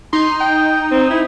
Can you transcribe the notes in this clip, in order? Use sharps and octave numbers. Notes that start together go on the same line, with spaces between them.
D#4 C6
G5
C4
E4